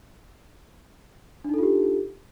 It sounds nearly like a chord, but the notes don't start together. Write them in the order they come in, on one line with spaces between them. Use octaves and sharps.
D4 D#4 A4 F4 G4